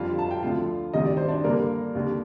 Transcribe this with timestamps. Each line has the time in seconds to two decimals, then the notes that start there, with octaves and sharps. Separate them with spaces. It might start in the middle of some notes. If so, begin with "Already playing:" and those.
Already playing: F2 D3 G3 F4 F5
0.19 A5
0.31 G5
0.42 D2 D3 F3 F4 F5
0.93 D2 C3 D#3 G3 D#5
1.05 D5
1.17 C5
1.28 D4 D5
1.44 G2 D3 G3 A#3 A#4
1.95 D#2 D3 G3